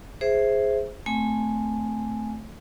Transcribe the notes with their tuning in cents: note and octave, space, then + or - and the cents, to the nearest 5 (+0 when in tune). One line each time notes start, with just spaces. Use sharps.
G#4 +0 C5 +0 E5 +0
A3 +0 C4 -15 G#5 +0